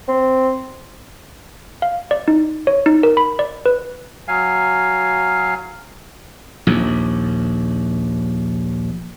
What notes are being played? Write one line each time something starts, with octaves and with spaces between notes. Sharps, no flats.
C4
F5
D5
D#4
C#5
D#4
A#4
B5
D5
B4
F#3 F5 G#5
A#1 D#2